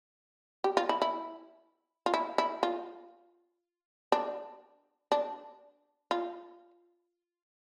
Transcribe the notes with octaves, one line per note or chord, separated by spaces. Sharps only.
G4
F4
E4
E4
F4
E4
E4
F4
D4
D4
F4